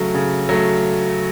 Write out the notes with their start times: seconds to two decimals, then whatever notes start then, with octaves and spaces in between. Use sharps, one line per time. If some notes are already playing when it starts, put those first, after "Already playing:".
Already playing: C#3 F#3 A3
0.15 C#3
0.49 F#3 A3